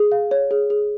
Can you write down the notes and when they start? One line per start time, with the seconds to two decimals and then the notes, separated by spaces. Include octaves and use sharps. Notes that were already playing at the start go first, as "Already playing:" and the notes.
Already playing: G#4
0.12 F5
0.31 C#5
0.51 G#4
0.70 G#4